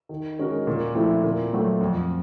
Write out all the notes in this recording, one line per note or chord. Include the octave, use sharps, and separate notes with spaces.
D#3
G#3 C#4 F#4 A#4
A#2
F3 A3 C4 E4
A#2
F#3 A3 C4
F2